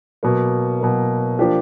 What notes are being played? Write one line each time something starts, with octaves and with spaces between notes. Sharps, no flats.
B2 F#3 A#3
B2 F#3 A#3
F3 A#3 D4 G4